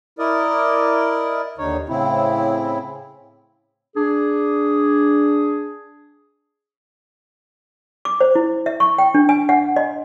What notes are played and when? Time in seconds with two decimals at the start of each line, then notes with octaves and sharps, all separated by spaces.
0.19 E4 A#4 D5 D#5
1.58 D#2 D3 D#4 C#5
1.89 A2 C#3 C4 E4
3.96 D4 G#4
8.05 D6
8.20 C5
8.35 E4
8.66 E5
8.80 C#6
8.99 G5
9.15 D4
9.29 G#5
9.49 F#5
9.76 D#5